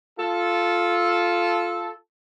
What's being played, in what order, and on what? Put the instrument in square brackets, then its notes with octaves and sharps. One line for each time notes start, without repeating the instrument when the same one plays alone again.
[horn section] F4 A4